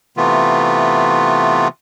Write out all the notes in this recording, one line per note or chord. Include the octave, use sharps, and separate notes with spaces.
C3 E3 A3 B3 F4